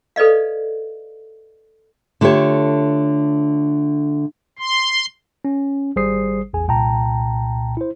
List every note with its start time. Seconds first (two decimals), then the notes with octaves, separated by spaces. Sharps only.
0.16 A4 B4 D5 D#5 F5
2.21 D3 A3 F4 G4 C#5
4.59 C6
5.45 C#4
5.96 G#1 G3 G#4 C5 D#6 C7
6.53 A1 E2 G#4 G#5
6.68 C2 A#2 G5 A5 A#5
7.77 E4 C5